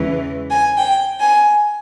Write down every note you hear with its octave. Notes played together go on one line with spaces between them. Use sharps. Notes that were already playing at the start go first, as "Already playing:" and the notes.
Already playing: E2 C#3 E3 G#3
G#5
G5
G#5